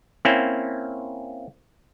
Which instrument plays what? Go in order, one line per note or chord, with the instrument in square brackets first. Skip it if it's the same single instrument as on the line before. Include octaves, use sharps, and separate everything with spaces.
[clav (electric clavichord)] A#3 C4 C#4 E4